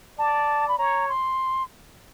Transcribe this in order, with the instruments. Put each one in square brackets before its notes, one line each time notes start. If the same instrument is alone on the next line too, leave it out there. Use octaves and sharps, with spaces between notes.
[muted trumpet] D5 [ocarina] A5
[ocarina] B5
[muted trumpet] C#5 [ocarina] A#5
[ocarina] C6